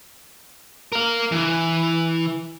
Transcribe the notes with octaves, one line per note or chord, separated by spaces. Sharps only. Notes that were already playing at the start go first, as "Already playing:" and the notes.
A#4 F5
E3